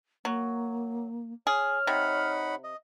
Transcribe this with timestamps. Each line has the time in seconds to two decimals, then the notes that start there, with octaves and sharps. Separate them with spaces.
0.25 F#3 A#3
1.47 G#4 C#5 F6
1.87 C3 D#4 F#5 B5
2.64 D#5